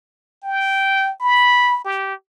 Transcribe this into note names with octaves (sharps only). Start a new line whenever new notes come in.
G5
B5
G4